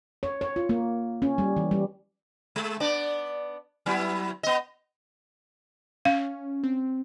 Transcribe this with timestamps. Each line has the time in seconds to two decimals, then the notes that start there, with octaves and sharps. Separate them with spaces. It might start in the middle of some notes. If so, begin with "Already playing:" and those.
0.23 C#5
0.41 C#5
0.56 F4
0.69 A#3
1.22 C#4
1.38 G3
1.57 E3
1.71 G3
2.56 G#3
2.80 B3 D4 D5
3.86 F#3 B3 E4
4.43 B3 D#5
6.05 C#4 F5
6.63 C4